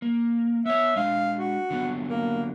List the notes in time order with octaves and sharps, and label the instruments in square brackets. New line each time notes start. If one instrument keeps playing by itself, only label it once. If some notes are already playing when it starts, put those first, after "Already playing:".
[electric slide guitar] A#3
[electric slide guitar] B3 C#5 [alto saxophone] E5
[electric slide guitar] G#3 D4 [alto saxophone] F5
[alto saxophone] F#4
[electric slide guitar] D3 F#3 B3
[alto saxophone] A#3